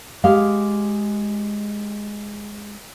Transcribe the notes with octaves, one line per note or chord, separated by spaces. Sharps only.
G#3 G4 F5